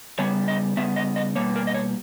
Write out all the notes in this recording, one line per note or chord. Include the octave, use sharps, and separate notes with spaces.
C#3 G3 B3 C#5
D#5
C#3 G3 B3 E5
D#5
D#5
B2 G3 A#3 C#5
A#4
D#5
C#5